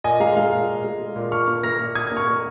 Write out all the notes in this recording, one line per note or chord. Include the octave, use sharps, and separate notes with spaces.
A#2 D#5 G#5
G#3 F5 A#5
G#3 F5
A#2 F5
A#2
G#3
G#3
A#2
A#2 C#6 F6
A#3
A#3 F6 A#6
A#2
A#2 D#6 G#6
A#3
C#6 F6
A#3